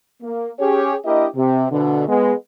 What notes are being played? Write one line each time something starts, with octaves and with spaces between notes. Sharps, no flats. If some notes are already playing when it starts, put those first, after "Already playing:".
A#3
C#4 G4 G#4 C#5
A#3 D4 E4 G4 A#4 D#5
C3
D2 B2 D3
G#3 B3